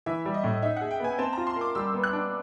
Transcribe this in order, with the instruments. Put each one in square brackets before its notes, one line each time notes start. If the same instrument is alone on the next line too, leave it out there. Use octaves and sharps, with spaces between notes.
[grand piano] E3 [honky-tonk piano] E5
[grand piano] G3
[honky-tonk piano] D#5
[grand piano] A2
[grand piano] D#4 [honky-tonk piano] E5
[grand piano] G#4 [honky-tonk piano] F#5
[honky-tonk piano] G5
[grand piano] B3 [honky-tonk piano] G#5
[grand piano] C4 [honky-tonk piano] A5
[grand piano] F4 [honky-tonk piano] A#5
[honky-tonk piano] C6
[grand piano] A#4
[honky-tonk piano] D6
[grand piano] G3 [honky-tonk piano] E6
[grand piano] B3
[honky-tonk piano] F#6
[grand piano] D4